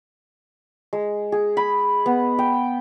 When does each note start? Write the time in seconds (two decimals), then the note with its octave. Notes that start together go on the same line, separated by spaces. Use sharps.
0.93 G#3
1.32 G#4
1.57 B5
2.06 B3
2.39 G5